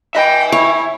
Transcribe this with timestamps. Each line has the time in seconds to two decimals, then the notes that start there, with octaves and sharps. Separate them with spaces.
0.15 D#4 D#5 E5 G5 G#5 B5
0.52 E4 C#5